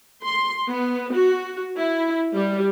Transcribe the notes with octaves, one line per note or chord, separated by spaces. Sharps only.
C6
B3
F#4
E4
G3